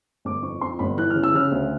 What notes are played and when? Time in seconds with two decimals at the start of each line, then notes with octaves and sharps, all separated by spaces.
0.25 G1 D6
0.43 F2 C#6
0.61 F2 C6
0.79 G1 B5
0.97 E3 F#6
1.10 F6
1.16 C#3
1.23 E6
1.34 C#3 F6
1.52 D2